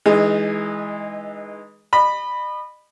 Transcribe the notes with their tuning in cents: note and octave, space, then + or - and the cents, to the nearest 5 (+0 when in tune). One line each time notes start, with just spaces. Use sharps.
E3 -20 G#3 +0 D#4 -20
D#5 -40 B5 +0